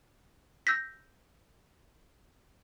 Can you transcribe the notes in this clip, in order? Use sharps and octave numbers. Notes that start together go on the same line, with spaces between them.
E6 G6 A#6 B6